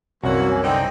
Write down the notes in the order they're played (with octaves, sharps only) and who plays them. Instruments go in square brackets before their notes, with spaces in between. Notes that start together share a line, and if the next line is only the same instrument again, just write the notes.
[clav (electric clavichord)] C2 F#2 [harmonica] E3 A#3 [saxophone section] F#4 [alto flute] C#5
[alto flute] G#5
[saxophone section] D3 [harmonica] C4 D#4 [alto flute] G5